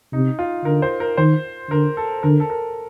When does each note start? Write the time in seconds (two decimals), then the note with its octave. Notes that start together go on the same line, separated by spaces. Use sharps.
0.13 C3 D#4
0.39 F4
0.65 D3 A#4
0.82 C5
1.00 A#4
1.17 D#3 C5
1.71 D3 A#4
1.97 A4
2.23 D3 A#4
2.40 A4
2.50 A#4